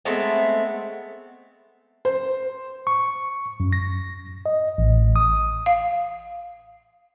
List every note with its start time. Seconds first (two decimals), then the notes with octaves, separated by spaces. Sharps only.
0.05 G#3 A3 B3 C4
2.05 C5
2.87 C#6
3.60 F#2
3.73 A#6
4.46 D#5
4.78 A1
5.16 D#6
5.66 F5